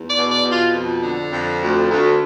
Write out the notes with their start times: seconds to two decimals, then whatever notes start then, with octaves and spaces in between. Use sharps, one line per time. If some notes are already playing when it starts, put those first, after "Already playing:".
Already playing: E2
0.08 D5
0.16 B2
0.30 D5
0.44 B2
0.52 F4
0.73 F2
1.03 D3
1.32 F2
1.62 D2
1.90 D2